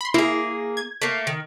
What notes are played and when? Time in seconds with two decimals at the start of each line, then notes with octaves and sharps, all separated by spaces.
0.01 B5 C6
0.14 A#3 E4 G#4
0.77 G#6
1.02 A3 A#3
1.27 D#3